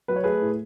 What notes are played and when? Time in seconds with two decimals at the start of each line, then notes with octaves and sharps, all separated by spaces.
0.08 F#3 B4
0.16 C#5
0.24 A3 G#4 B4
0.42 A2